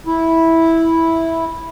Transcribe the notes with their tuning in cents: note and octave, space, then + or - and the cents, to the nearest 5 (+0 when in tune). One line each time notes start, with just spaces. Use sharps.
E4 -10